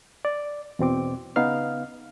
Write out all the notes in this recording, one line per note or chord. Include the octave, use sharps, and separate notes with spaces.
D5
E2 B2 C4 D6
C#3 B3 D#4 F5 F6